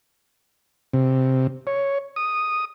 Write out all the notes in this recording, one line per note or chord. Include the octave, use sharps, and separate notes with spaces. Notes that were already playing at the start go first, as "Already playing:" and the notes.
C3
C#5
D#6